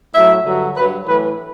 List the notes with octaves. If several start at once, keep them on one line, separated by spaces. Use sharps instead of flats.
A2 F#3 E5
G2 D3 F#3
G2 F#3 B4
A2 E3 B4